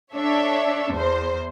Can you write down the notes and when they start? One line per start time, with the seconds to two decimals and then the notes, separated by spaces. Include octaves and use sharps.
0.14 D4 A4 C#5 E5
0.92 E2 C5